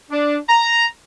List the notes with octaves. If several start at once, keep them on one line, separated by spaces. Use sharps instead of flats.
D4
A#5